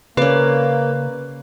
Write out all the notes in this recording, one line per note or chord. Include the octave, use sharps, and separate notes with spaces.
C#3 A#3 C#4 B4 D5